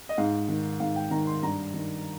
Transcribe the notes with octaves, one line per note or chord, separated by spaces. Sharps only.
D#5
G#2 F5
D#3
G#2 F5
G5
D#3 A#5
C6
G2 A#5
D#3